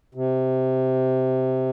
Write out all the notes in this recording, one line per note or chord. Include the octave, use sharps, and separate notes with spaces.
C3